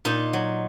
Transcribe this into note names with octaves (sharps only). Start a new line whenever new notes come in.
A#2 D#4
F#3